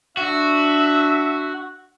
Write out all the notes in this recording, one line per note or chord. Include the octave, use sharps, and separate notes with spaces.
D4 F#4 E5